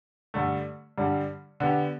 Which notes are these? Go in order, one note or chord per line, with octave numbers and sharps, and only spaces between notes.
G2 D3 A3
G2 D3 G3
D3 B3 G4